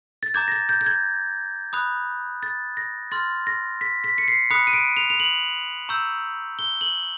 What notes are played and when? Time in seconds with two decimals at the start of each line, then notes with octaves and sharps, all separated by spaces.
0.23 A6
0.34 A#5 D6 G6 G#6
0.48 A#6
0.52 A6
0.69 G6
0.81 G6
0.86 G#6
1.73 B5 D#6 F#6
2.43 A6
2.77 A#6
3.12 C6 F6 A6
3.47 A#6
3.81 B6
4.04 B6
4.18 C#7
4.28 C7
4.50 B5 D#6 F#6 C#7
4.67 D#7
4.73 D7
4.97 F7
5.10 F7
5.20 F#7
5.89 A#5 C#6 E6 G6
6.59 G7
6.81 F#7